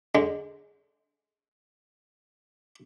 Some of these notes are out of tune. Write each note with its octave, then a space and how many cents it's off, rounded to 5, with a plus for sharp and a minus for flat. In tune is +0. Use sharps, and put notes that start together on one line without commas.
D3 -15 G#3 +0